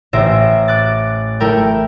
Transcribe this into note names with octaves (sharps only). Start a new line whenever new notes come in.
A1 C5 E5 A#6 D7
D6 F#6 A6
A3 E4 A#4 G5